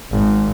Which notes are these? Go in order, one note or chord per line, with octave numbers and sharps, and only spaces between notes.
G#1